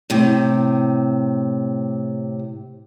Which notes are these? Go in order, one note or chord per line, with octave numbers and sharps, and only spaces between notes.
A2 C3